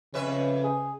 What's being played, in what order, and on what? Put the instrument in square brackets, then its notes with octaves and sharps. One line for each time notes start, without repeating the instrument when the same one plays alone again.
[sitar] F2 B4 E5 [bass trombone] C#3 [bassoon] C#4
[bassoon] G#4